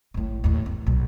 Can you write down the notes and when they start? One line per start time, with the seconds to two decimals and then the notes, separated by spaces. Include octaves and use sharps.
0.14 A1 A2
0.44 D#2 A2
0.66 E2
0.87 B1 A#2